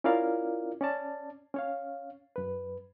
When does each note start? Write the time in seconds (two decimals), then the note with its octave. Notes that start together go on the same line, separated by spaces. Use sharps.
0.04 C#4 E4 F4 A#4 D5 F5
0.81 C#4 D5 A5
1.54 C#4 C#5 F5
2.36 F#2 B4